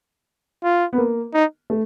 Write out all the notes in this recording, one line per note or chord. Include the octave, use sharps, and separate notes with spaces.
F4
B3
A#3
D#4
A3